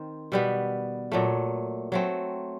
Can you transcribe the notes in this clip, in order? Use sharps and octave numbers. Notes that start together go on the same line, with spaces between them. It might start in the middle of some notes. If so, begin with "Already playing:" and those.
Already playing: D#3 C4
B2 G3 B3
A#2 F#3 A3
F#3 A3 C4